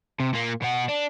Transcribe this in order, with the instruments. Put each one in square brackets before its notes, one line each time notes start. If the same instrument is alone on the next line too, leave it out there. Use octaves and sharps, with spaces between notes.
[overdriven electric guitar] C3
A#2 A#3
B2 F#5
D4